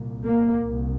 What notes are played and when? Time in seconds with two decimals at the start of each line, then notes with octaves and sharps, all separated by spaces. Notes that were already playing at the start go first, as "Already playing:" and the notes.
Already playing: C2 A#2
0.27 A#3
0.67 C2